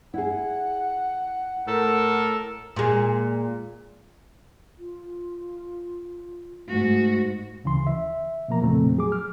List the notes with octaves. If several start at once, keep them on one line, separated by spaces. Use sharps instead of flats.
E4 G#4 F#5
A2 A4 A#4
A#2 G#3
F4
G#2 A3 F#4
D2 C#3 E3 C6
E5
B2 F3 A#3 A#5
F2 A#2 C#3 A3 C4
F#3 G#4 D6
F6